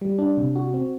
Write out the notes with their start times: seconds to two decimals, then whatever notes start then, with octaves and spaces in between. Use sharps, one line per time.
0.01 G3
0.19 D4
0.37 C3
0.56 F#4
0.74 C4